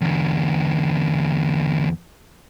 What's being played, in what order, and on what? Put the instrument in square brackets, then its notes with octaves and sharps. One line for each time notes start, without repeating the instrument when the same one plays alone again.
[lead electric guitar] E2 D3